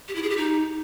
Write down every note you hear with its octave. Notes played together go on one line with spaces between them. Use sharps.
G4
E4
G#4
G4
D#4